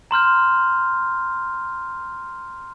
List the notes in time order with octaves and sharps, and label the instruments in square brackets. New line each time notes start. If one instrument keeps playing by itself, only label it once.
[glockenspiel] A#5 C6 F6 G6